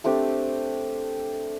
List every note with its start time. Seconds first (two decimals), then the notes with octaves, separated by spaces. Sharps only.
0.04 A3 C4 D4 G4